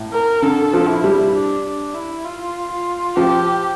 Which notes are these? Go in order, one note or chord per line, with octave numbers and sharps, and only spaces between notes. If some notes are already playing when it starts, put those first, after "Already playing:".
Already playing: A2
A#4
D3 A4
F3
E4
G3
D4
D4
E4
F4
F4
F3 G4